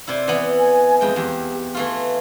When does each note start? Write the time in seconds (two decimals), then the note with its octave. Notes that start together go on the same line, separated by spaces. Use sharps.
0.07 C3 E4 D5
0.28 E3 B3
0.58 G#5
1.01 F2 G#3 G5
1.16 E2 G4
1.74 E3 A3 F4